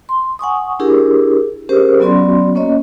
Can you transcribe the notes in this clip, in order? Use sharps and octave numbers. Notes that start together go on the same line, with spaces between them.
C6
F#5 G#5 C#6 D#6
D4 E4 G4 G#4 A#4
C#4 G4 G#4 A#4 C5
F#3 B3 C#4 F#4 D5 C6
A#3 C#4 C#5 D#5